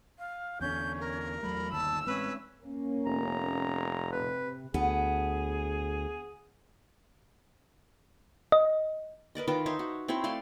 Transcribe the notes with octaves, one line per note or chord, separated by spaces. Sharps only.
F5
E2 D3 C#4 G6
A#4
E2 F#3 A3 B5
G1 D#2 D#3 A5 E6
A1 G#3 C4 C#4 B4
A#3 C#4
F1 A#5
C3 B4
D2 B3 G#4
D#5
A#4 B4 D5 D#5
D#3 F4 B4 D6
D#4 C5 C#5 E5
F#4
C4 E4 C5 C#5
A3 D5 F5 C6